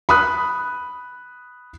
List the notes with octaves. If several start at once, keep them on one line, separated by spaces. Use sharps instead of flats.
B5 D#6 F#6